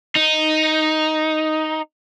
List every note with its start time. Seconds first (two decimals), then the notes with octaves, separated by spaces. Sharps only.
0.16 D#4